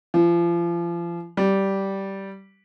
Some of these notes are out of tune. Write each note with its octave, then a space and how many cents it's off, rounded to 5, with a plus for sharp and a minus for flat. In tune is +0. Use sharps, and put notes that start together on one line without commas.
F3 -35
G3 -10